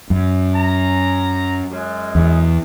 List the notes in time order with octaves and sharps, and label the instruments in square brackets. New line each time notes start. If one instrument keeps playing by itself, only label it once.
[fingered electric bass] F#2
[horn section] A#5
F#2 G#3
[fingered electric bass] E2